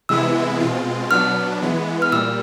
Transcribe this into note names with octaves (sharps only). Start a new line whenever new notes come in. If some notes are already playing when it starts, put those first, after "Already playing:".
C3 E3 G#3 B3 E4 E6
B2 G#3 C4 F4
B2 F#3 B3 D4 F6
E3 G#3 B3
F6
A#2 G3 E6